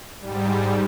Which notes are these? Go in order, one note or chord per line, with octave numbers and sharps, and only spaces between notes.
G#2 G3